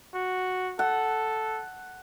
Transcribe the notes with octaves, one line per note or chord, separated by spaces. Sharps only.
F#4
A4 F#5